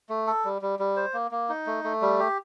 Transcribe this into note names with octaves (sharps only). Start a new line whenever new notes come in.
A3
A4
G3
G3
G3
C5
A#3
A#3
D#4
A3
A3
G3
G4